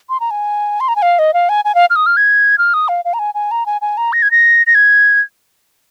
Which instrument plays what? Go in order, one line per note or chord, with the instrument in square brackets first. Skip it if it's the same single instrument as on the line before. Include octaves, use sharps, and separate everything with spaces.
[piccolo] C6
A#5
G#5
C6
A#5
G#5
F5
D#5
F5
G#5
G#5
F5
F6
D#6
F6
G#6
F6
D#6
F5
F5
A#5
G#5
G#5
A#5
G#5
G#5
A#5
A#6
G#6
A#6
A#6
G#6